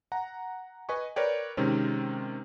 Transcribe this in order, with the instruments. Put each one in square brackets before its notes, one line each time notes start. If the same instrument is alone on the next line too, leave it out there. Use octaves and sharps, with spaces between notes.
[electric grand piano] F#5 A#5
B4 D#5 G#5 C#6
A#4 B4 C#5 D5 G5
C3 D#3 G#3 C4 C#4